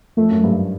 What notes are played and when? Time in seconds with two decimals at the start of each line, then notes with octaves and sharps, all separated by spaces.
0.17 F2 A3
0.30 F#2
0.44 G2